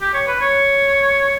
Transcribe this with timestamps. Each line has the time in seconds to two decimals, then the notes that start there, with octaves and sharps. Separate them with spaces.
0.01 G4
0.14 C#5
0.27 B4
0.40 C#5